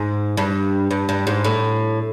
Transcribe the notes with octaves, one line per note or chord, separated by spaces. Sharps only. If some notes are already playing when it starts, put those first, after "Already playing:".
Already playing: G#2
G2
G2
G2
G#2
A2